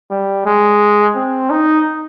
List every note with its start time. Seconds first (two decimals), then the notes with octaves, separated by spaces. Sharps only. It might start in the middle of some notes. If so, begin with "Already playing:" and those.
0.10 G3
0.45 G#3
1.16 C4
1.50 D#4